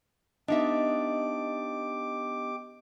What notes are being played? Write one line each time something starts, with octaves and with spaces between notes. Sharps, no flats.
B3 D4 D#4 G4 D#5 E5 D6